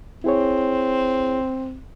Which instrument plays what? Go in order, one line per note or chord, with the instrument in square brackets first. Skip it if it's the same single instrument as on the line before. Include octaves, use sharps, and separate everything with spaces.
[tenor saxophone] C4 [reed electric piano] E4 G#4 C#5